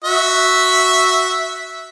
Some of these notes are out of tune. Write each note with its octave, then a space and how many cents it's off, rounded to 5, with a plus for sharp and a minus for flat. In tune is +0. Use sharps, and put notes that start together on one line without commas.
F#4 +0 E5 -5